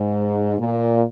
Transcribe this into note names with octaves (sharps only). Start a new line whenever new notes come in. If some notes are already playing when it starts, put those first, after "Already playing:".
Already playing: G#2
A#2